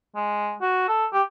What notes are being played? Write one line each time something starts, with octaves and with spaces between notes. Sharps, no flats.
G#3
F#4
A4
G4